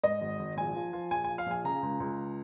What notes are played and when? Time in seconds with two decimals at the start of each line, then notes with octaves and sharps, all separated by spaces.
0.04 G#2 D#5
0.21 G#1
0.39 G#1
0.57 A#1 G#5
0.75 F3
0.93 F3
1.11 A#1 G#5
1.24 F3 G#5
1.38 F5
1.46 A#1 G#5
1.65 C#3 A#5
1.82 C#2
2.00 C#2